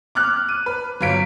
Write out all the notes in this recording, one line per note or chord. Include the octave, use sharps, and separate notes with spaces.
D6 F6 F#6
D#7
B4
G1 F#3 F5 B6 D7